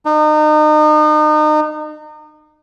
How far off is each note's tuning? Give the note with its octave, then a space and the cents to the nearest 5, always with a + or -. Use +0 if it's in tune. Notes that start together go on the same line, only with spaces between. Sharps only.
D#4 -35